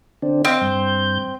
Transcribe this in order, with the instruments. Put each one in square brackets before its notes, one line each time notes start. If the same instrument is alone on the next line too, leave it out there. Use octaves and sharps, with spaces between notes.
[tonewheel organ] D3 C4 D4
[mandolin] C4 [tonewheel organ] D#5 F5 D6
[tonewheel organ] G2 G6